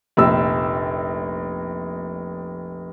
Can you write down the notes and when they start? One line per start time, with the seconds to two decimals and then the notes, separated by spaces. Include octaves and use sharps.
0.17 F1 A#1 E6